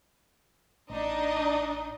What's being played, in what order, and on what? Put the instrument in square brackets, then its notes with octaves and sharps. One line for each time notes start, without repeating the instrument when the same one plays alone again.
[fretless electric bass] A1 [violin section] D4 D#4 D#5